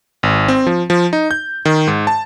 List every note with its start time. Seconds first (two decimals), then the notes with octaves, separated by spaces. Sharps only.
0.23 G#1
0.48 C4
0.67 F3
0.90 F3
1.13 D#4
1.31 G6
1.65 D#3
1.87 G#2
2.07 A5